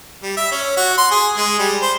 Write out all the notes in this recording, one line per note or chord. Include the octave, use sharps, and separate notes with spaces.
G3
E5
C#4
F#4
C6
G#4
G#3
G3
C5